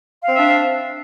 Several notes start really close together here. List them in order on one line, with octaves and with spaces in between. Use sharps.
F5 C4 E5 D4